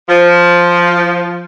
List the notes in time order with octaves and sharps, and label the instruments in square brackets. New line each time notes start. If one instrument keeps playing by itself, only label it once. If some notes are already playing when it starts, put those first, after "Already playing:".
[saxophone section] F3